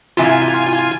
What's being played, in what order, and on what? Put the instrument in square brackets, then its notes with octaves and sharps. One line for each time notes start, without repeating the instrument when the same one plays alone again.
[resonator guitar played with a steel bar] G#2 C3 E3 [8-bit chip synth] F4 G#5